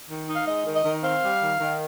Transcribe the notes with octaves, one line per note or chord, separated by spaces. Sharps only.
D#3
D#4
F5
G#3 D#5
D#3
D#5
D#3
C4 F5
G3
D#3
D#3